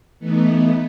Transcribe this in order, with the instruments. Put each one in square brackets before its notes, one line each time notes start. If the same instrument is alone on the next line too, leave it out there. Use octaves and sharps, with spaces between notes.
[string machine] E3 A3 B3 D#4